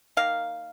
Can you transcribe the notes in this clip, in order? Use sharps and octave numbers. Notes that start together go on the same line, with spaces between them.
D#3 A#3 F5